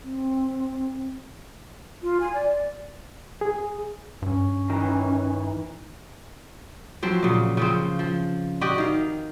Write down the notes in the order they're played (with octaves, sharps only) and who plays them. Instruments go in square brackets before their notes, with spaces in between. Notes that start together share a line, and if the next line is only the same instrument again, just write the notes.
[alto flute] C4
[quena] F4
G#5
D5
[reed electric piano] G#4
[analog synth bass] G2 [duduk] C#4
[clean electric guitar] D#3 E3
[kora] F3 F#3 C4
A#2 C#3
C#3 F3 C4
F3
F#4 G4 D5 D#5
D#3 F5